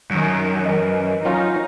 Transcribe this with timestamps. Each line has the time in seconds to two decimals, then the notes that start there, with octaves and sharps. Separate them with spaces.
0.10 F#2 D#3
0.66 E3 A#4 D#5
1.25 F#3 C#4 D#4 F4